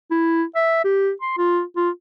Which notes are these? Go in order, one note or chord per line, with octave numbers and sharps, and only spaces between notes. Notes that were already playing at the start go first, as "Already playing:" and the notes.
E4
E5
G4
C6
F4
F4